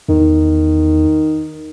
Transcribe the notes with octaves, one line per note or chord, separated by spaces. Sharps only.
E2 D#3